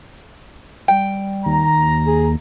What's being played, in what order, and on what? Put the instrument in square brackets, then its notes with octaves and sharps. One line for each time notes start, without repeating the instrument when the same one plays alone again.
[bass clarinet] G3 [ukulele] G5
[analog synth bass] D#2 [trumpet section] A#5
[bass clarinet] G#4